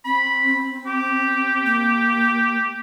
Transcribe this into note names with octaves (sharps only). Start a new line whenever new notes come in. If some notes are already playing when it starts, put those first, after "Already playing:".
C4 B5
G4
A#3